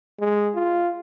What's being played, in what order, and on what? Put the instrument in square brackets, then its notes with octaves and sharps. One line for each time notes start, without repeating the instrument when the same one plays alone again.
[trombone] G#3
F4